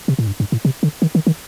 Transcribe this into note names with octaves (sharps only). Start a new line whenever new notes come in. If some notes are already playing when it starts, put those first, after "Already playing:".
C3
A2
G2
G2
A2
C3
D3
D#3
D#3
D#3